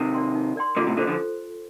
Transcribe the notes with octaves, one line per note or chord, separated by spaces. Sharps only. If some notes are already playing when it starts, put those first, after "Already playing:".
Already playing: C3 D#3
A#4 D5 G5 C6
D#4
A#4 D5 G5 C6
A#2 D3 F4
A2 C3
A#2 D3 A4 C5
D3 F3